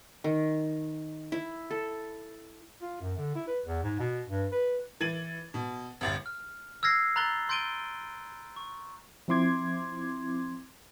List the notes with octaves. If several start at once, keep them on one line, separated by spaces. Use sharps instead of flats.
D#3
E4
A4
F4
F#2
D3
E4
B4
E2
G#2
B2
G2
B4
E3 G#6 A6 D#7 F#7
B2
G1 C2 A6
F6
E6 F6 G#6 A#6 C7
A#5 B5 F#6 A6 G7
C6 G6 A6 D7 D#7 G7
C#6
F3 C4 E4 C6 D6 G#6